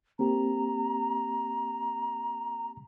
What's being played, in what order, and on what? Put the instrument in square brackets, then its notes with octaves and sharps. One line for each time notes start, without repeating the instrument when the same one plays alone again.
[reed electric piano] A#3 C4 G4 [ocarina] A#5